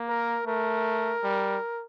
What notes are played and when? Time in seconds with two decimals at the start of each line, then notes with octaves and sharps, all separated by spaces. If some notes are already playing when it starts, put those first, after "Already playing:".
Already playing: A#3
0.09 A#4
0.47 A3 A#4
1.23 G3